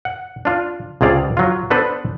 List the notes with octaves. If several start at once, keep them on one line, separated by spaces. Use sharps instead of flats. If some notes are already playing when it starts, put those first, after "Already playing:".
F#5
D4 F4
C#2 C3 G#4 D5 F5
F#3 F4
B3 D4 A4 B4 C5